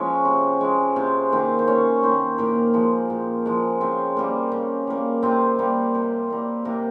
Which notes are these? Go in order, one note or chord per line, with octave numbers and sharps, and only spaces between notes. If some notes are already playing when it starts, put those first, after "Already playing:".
Already playing: F3 G#3 C#4 C#5
C3
F3 G#3
C3 C4 C5
D#3 A#3 C4 C5
C5
C3 C#4 C#5
D#3 A#3 C4 C5
A#2 A#3 A#4
F3 G#3
A#2
F3 G#3
C#3 C4 C5
G3 A#3
C#3
G3 A#3
C3 C4 C5
G3 A#3
C3
G3 A#3
C3 A#3 A#4